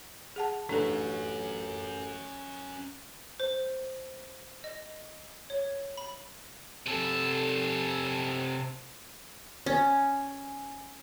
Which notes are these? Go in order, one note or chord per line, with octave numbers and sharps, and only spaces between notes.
G#4 F#5 A5
A1 C#4 D4 F#4 A4
C5
D#5
C#5
B5
C3 A4
C#4